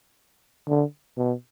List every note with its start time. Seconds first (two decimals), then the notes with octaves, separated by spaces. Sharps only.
0.68 D3
1.18 B2